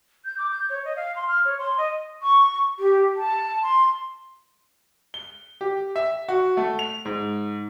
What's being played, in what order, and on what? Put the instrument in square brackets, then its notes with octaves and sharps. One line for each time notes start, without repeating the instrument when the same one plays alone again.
[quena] G6
D6
G6
C#5
D#5
F5
C6
F6
C#5
C6
D#5
[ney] C#6
G4
A5
C6
[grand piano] G7
G4
E5
F#4
A3
F7
G#2